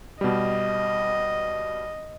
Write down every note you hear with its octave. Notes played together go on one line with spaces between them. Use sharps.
B2 G3 D#5